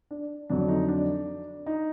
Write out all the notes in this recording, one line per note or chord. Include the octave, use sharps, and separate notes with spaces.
D4
F2 D3 F#3 D4
D#4
D4
D#4